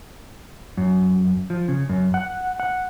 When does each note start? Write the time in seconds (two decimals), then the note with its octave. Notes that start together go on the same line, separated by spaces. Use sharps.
0.77 F#2
1.50 F3
1.68 C#3
1.89 F#2
2.14 F#5
2.60 F#5